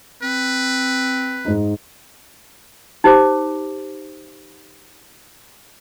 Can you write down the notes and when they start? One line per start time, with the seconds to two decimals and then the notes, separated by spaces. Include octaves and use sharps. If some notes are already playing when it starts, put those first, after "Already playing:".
0.23 C4 B4
1.45 G#2 D#4
3.04 D#4 G4 C5 D6